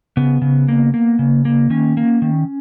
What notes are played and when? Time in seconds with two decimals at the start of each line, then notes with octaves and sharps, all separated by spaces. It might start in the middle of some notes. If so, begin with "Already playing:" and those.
0.17 C#3 B3
0.42 C#3
0.68 A#3
0.94 A#3
1.19 C#3
1.45 A#3
1.70 D#3 C#4
1.97 A#3
2.22 D#3